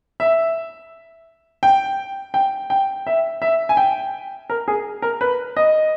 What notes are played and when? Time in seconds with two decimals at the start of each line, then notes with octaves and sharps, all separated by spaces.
0.20 E5
1.63 G5
2.34 G5
2.70 G5
3.07 E5
3.42 E5
3.69 G#5
3.77 G5
4.50 A#4
4.68 G#4
5.02 A#4
5.21 B4
5.57 D#5